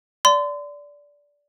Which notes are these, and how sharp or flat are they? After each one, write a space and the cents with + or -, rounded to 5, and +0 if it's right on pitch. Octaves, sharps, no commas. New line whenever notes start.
D5 -15 C6 -35